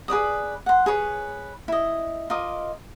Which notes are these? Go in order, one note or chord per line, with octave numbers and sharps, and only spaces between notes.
G#4 B4 D5 D#6
F#5 C6
G#4 B4 C#5
E4 D#5
F4 A#4 D#5 D6